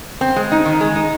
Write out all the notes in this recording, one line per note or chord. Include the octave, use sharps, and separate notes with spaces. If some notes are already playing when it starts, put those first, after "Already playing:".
C4
G#3
D#4
D#3
G#3
D#4